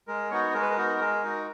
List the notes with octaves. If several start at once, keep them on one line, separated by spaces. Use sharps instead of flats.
G#3 A#4
B3 D#4 F#4 C#5
G#3 A#4
B4
A#4
B3 D#4 F#4
G#3 A#4
D#4 F#4